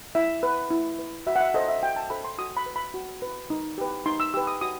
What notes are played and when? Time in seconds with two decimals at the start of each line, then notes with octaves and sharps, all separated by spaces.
0.15 E4 E5
0.43 B4
0.71 E4
0.99 B4
1.27 F#4 E5
1.36 F#5
1.41 E5
1.54 A4 C5 D#5
1.68 E5
1.83 F#4 G5
1.96 A5
2.10 A4 C5 B5
2.25 C6
2.38 F#4 D#6
2.57 B5
2.66 B4
2.76 B5
2.94 F#4
3.22 B4
3.50 D#4
3.78 G4 B4
4.06 D#4 C6
4.20 E6
4.34 G4 B4 E6
4.47 D#6
4.61 F#4 D#6